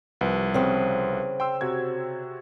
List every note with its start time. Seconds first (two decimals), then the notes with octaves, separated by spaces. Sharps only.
0.21 C2 F3 B4
0.54 C#3 C4
1.40 G5 C6 E6
1.61 C3 F#4 G#6